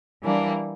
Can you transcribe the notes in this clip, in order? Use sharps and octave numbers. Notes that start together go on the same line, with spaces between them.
E3 G3 A#3 D4